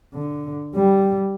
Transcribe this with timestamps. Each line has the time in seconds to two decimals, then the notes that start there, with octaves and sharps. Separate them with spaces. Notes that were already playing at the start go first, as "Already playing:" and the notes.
0.14 D3
0.76 G3